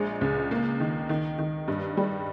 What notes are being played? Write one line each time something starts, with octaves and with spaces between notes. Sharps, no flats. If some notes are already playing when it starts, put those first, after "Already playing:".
Already playing: A#1 G#3
C#2
A#3
D#3
D#3
D#3
G2
G3